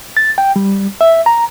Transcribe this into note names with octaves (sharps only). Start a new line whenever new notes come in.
A6
G5
G3
E5
A#5